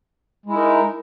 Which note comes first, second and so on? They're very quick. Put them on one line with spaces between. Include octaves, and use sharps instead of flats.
G#3 E4 D#4 A#4